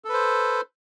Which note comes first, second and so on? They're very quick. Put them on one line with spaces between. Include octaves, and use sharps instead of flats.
A4 B4 C5